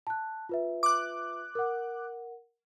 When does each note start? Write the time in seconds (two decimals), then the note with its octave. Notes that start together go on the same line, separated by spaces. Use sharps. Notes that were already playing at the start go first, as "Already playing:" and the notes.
0.07 A5 F#6
0.49 F4 B4 E5
0.83 D6 F#6
1.55 A#4 F#5